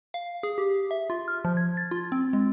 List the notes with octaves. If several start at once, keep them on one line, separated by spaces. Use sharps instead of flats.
F5
G#4
G4
E5
F4
F6
F3
G#6
A6
F4
C4
G#3